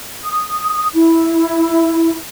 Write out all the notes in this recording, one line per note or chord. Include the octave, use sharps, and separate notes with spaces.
D#6
E4